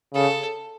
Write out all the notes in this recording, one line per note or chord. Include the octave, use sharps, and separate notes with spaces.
C#3 A4